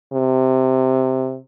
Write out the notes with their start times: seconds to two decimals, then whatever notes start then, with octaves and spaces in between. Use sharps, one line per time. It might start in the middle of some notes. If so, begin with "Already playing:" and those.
0.13 C3